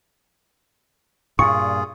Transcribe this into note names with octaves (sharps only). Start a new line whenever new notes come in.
G2 A#2 F4 G#4 C#6